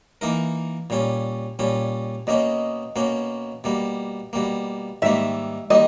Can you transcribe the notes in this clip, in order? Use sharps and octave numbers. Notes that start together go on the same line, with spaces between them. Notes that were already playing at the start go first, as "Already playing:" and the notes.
E3 A#3 D#4 A#4
A#2 G3 C#4
A#2 G3 C#4
B2 A#3 C#4 D#5
B2 A#3 C#4
B2 G3 A#3
B2 G3 A#3
G#2 D#3 G3 A#3 E5
D#3 G3 A#3 D#5